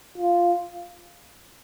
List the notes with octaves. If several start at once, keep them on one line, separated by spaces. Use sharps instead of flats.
F4